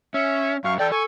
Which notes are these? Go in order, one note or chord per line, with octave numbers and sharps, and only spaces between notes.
C#4 E5
F#2 F5 C#6
E3 A4 D5 G5
A4 G#5 C#6